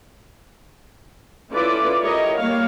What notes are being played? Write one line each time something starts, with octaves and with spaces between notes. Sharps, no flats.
C#4 E4 F4 A4 B4 D5
G3 E4 A#4 C#5 D#5
G3 A#3 C#5 F5